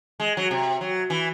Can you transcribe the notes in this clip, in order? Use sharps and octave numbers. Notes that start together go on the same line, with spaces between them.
G#3
F#3
C3
F#3
E3